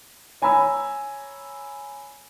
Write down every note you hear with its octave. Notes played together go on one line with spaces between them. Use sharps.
C#5 G#5 A#5 B5 E6